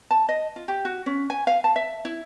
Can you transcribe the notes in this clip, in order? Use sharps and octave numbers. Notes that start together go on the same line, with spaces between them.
A5
D#5
F4
G4
F#4
C#4
G#5
F5
A5
E5
E4